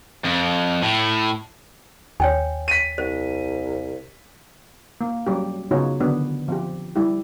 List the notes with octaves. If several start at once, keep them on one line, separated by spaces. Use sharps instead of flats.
F2
A2
D#2 C#5 G5 G#5
B6 D#7
C2 C5
A#3
F#3 G3 C#4 G4
C#3 B3 D#4 F4 F#4 C#5
D3 D#3 F#3 B3 D4
F3 C4 G4
G3 E4 G4